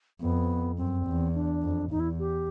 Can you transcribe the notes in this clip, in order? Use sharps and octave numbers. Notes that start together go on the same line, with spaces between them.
F2 B3
F#2 C4
E2
D4
F2
E2 D#4
E4
G4